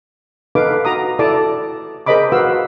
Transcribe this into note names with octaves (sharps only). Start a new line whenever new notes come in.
D#4 A4 B4 F5 D6
F#4 A#5 D#6
E4 A4 D5 A5 D6
G#4 A#4 C5 D#5 B5 D6
F#4 B4 F5 E6